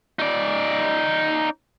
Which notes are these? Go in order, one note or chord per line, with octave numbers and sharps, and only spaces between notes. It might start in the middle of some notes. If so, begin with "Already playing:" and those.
D#4 D5